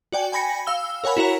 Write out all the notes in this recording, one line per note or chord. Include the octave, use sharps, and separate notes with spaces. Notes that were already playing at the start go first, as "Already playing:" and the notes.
F#4 D5 G5 G#5
G5 G#5 B5 A#6 C#7
F5 E6 G7
A#4 C#5 F#5 G#5 B5
E4 F#4 A#4 C#5 A#5